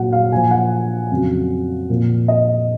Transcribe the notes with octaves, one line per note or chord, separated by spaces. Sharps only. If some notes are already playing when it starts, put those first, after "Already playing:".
Already playing: A#2 F#3 F#5
F5
A#2 F3 G#5
F#5
F2 C#3 F#3
A#2 F3
D#5